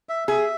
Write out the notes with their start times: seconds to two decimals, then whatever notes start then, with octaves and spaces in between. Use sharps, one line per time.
0.09 E5
0.28 G#4 E5